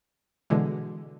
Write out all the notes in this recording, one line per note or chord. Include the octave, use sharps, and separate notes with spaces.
B2 D3 E3 G#3